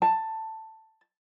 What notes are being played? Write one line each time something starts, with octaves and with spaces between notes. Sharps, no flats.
A5